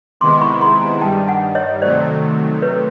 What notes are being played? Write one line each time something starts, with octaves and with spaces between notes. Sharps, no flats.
C3 D#3 G#3 B3 E4 C6 D6
B5 C#6
A#5 C6
G#5 A#5
G2 D#3 G3 G5 A5
F#5 G#5
C#5 D#5
C3 D#3 F#3 A3 C5 D5
B4 C#5